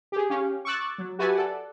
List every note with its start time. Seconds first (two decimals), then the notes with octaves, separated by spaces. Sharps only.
0.12 G4 G#4
0.30 C#4 G4 F5
0.65 C#6 D6 E6 F#6 A6
0.98 F#3
1.19 F#4 G4 B4 E5 G#5 A5
1.33 A4 D5 F#5